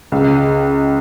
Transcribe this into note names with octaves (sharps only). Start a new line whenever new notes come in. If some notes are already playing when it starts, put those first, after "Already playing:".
C#2